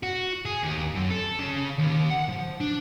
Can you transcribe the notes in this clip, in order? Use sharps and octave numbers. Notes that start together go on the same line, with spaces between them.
F#4
G#4
D#2
F#2
A4
C#3
D#2
F#5
F3
D4